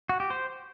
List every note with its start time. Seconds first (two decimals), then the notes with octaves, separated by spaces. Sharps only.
0.09 F#4
0.20 G4
0.30 C5